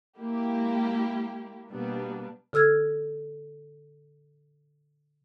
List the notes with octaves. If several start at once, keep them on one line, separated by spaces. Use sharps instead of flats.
G#3 A#3 E4 G4
B2 G3 A#3 B3 D4
D3 A4 E6 F6 G#6